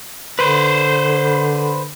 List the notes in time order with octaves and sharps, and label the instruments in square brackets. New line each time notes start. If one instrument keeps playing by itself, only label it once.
[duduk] D3 [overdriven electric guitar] B4 C5